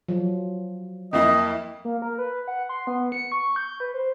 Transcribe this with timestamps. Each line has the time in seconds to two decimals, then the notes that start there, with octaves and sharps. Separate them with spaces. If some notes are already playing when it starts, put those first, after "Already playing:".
0.08 F3 F#3
1.13 F2 A#3 E4 D#5
1.85 A#3
2.02 A#4
2.18 B4
2.48 F#5
2.69 C6
2.87 B3
3.12 C#7
3.32 C#6
3.56 G6
3.80 B4
3.94 C5